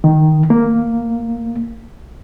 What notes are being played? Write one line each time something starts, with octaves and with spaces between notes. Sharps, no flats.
D#3
A#3